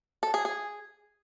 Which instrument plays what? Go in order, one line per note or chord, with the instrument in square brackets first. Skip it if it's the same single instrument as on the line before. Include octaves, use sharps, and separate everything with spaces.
[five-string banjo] A4
G#4
G#4